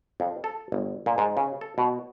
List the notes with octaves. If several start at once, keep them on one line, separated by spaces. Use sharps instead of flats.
F2
A4
G1
A#2
G#2
C#3
A4
B2